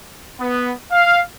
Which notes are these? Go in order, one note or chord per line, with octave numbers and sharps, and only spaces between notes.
B3
F5